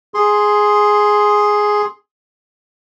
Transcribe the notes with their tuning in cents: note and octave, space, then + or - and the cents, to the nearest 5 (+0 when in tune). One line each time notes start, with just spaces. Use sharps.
G#4 +0 C6 +0